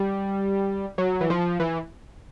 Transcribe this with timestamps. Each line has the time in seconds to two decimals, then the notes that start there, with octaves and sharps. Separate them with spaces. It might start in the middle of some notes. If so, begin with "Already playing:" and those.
Already playing: G3
0.98 F#3
1.21 E3
1.30 F3
1.60 E3